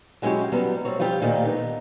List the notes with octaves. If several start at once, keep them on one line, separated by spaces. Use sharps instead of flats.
F#3 G#3 C#4 E4 F#4 G4
F#3 G3 B3
G3 C4 C#5
F3 G3 C4 F4 G4
A#2 D#3 F3 A3 A#3
B3 D#4